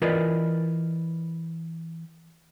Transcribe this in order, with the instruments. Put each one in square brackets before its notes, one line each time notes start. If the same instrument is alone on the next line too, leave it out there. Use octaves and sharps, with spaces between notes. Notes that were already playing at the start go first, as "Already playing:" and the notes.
[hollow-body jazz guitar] E3 F4 A#4 B4 D5 D#5